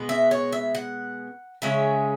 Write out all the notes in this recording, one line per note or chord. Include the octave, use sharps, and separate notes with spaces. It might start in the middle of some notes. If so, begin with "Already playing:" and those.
Already playing: B2 G#3 B3
E5
C#5
E5
F#5
C#3 G#3 C#4 E5